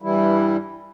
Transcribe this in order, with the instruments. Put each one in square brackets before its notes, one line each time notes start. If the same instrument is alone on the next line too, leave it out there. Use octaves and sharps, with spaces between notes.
[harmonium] G2 E3 G3 E4